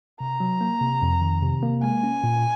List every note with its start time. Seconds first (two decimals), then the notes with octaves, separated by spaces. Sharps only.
0.20 C3 A#5
0.40 F#3
0.61 A#3
0.81 C3
1.02 F2
1.22 D#3
1.42 C3
1.63 A#3
1.83 G#3 G#5
2.03 C#4
2.24 A#2